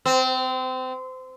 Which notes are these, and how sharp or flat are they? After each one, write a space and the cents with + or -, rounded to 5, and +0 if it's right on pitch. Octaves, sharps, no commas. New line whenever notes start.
C4 -25